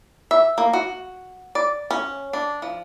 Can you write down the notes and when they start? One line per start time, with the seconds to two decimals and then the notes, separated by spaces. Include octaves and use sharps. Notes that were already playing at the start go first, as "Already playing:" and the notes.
0.31 E5
0.58 A#3
0.73 F#4
1.55 D5
1.91 C#4
2.33 D4
2.62 F3